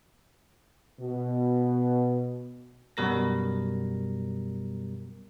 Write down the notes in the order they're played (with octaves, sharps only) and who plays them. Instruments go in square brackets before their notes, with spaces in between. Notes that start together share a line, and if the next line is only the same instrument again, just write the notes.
[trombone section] B2
[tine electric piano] F#2 B2 G3 A#4 A#6